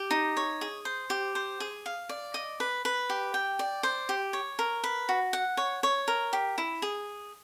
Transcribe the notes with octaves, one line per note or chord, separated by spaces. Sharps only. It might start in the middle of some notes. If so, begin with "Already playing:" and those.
Already playing: G4
D#4
C#5
G#4
C5
G4
C5
G#4
F5
D5
D#5
B4
B4
G4
G5
D5
C5
G4
C#5
A#4
B4
F#4
F#5
C#5
C#5
A#4
G4
E4
G#4